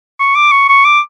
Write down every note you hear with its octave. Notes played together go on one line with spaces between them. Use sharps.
C#6
D6
C#6
C#6
D6